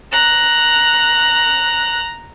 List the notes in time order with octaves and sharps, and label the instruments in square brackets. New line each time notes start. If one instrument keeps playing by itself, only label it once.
[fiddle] A#5 F#6